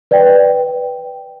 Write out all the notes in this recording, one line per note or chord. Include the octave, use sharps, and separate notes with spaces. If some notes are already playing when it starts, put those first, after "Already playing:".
B4 D5 G5